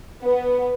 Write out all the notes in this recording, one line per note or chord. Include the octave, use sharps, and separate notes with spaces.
B3